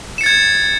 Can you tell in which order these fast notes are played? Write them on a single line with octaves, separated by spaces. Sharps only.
E7 C#7 A6 G#6